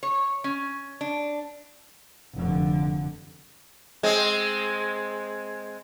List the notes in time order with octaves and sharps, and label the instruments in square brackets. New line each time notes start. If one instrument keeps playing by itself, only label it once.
[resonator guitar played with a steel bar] C#5
C#4
D4
[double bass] F1 D3
[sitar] G#3 C4